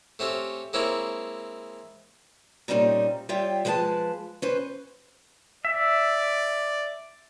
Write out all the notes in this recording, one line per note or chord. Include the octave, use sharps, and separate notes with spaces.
A3 C4 C#4 G4
G#3 A#3 C4 E4 C#5
A#2 G3 C4 C#4 D#4
G3 F4 C#5 E5 G5
F3 G#3 B4 F5 A5
C#4 B4 C5
D5 E5